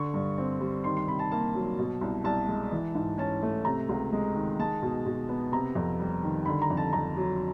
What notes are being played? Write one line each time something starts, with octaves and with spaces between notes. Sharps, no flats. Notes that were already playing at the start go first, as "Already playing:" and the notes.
Already playing: D3 C#6
G2
C4
G3
D#3 C6
C6
C3 B5
A5
A#3 A5
F#3
B2
C2
C2 A5
G#3
E3
G#2
C#4 A5
A3
C3 A#5
C#2
G#3
D#3
G#3 A5
B2
B2
B3
C3 A#5
F2
G3
D#3
D3 B5
A#5
F2
A5
F2 A#5
F#3